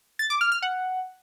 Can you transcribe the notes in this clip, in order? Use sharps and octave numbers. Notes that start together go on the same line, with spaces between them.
A6
D6
F6
F6
F#5